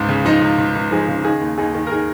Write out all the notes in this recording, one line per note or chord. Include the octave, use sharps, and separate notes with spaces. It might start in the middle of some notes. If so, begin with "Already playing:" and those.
Already playing: C#2 G#2
C#3
F3 D#4
C#2
C#2
C#2
F3 D#4 G#4
C#3
D#3 D#4 G#4
D#2
D#2 D#4 G#4
D#3
A#4
D#4 G#4